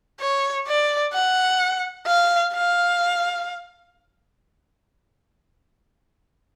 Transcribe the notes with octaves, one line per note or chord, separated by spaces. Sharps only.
C#5
D5
F#5
F5
F5